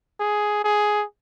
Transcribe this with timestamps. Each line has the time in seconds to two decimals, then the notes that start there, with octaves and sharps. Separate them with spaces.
0.20 G#4
0.64 G#4